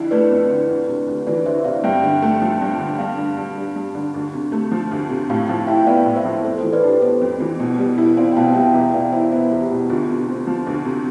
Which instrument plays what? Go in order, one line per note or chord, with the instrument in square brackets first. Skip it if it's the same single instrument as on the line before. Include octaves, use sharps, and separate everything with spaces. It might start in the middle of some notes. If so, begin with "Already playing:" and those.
Already playing: [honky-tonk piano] F2 D3 E4
[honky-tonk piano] A3 [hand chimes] B4 D5
[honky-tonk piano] F2
D3
D2
C3
D2
[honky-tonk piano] E3 [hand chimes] B4 D5
[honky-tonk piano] D2 [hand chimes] C5 E5
[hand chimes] E5
[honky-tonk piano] C3 [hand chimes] D5 F5
[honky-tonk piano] G2 [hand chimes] E5 G5
[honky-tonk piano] D3
A3
F3
G2
D3
[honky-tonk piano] G2 [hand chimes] F5 A5
[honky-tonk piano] D3
G2
G3
G2
D3
D2
C3
A3
F3
D2
C3
[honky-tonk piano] A2 [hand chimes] F5 A5
[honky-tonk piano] F3 [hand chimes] F5 A5
[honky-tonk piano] E4 [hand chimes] E5 G5
[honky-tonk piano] B3 [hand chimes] D5 F5
[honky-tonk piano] A2
[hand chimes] C5 E5
[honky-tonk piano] F3
[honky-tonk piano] F2 [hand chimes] A4 C5
[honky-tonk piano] E3 [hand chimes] A4 C5
[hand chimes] B4 D5
[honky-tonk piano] D4 [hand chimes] G4 B4
[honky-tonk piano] B3 [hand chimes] A4 C5
[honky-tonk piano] F2
E3
B2
G3
E4
[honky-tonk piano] C4 [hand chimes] D5 F5
[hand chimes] G5
[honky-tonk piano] B2 [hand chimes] F5 A5
[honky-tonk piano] G3 [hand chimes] E5 G5
[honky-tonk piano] E2 [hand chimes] E5 G5
[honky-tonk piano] B2 [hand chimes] D5 F5
[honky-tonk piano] E4 [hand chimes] C5 E5
[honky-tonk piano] B3 [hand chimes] C5 E5
[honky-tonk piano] E2
[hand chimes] G4
[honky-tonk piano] B2
[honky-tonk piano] D2 [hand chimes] F4
[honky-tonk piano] C3
C4
F3
D2
C3